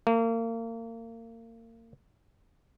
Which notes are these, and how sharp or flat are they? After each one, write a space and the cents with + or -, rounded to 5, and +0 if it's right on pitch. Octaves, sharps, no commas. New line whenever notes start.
A#3 -35